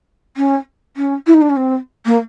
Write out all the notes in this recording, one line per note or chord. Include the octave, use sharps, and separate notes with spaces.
C#4
C#4
E4
D#4
D4
C#4
C4
A#3